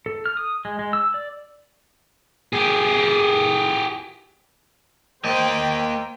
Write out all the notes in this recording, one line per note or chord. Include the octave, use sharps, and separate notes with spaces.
A4
F6
D#6
G#3
G#3
E6
D5
G4 G#4
A#3 C5 D#5 G5